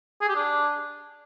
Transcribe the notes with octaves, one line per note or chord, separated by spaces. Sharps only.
G#4
G4
D4